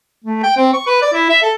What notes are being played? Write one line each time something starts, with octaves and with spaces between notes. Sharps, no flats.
A3
G5
C4
C#6
B4
D5
E4
E5
A4